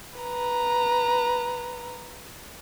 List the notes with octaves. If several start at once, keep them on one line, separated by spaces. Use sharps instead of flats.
B4 A#5